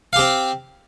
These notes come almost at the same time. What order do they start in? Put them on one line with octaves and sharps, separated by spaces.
F5 G4 C4